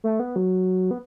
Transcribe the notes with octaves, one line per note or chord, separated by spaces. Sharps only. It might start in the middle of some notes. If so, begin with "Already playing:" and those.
A3
B3
F#3
B3